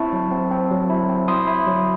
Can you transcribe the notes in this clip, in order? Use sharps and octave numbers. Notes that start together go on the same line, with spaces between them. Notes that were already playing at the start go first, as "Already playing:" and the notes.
Already playing: C4 E4 A5 C#6
F#3
C4
C4
F#3
E4
C4
E4 C6 D#6
E4
F#3